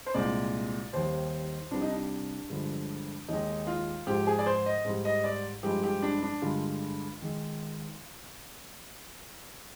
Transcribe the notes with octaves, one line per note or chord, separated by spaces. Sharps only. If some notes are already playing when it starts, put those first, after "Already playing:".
C5
C2 A#2 G#3 D5
D#2 D#3 G3 C5
C2 C3 G3 D4
D#4
D4
G2 D3 F3 G#3
D#2 D#3 G#3 D#4
F4
G#2 F3 G#3 G4
G#4
D5
C5
D#5
G#2 G3
D#5
D5
G2 F3 G#3 G4
G4
D4
D4
G2 D3 G#3 F4
D#3 G#3